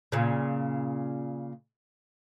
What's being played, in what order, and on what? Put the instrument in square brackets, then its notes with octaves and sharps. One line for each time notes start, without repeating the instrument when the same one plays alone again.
[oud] A#2 C#3